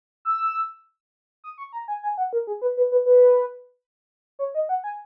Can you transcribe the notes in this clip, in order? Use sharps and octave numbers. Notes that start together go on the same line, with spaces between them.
E6
D#6
C#6
A#5
G#5
G#5
F#5
A#4
G#4
B4
B4
B4
B4
C#5
D#5
F#5
G#5